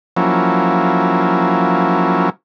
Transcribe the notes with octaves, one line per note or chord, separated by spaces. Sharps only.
F3 F#3 A#3 C#4 E4